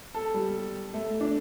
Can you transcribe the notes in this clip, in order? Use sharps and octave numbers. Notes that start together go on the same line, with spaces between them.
A4
G3
A3
D4